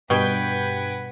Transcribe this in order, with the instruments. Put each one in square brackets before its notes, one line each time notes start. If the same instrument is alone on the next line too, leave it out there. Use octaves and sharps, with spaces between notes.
[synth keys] G2 G5 G#6 [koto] B2 [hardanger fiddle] B4 F#5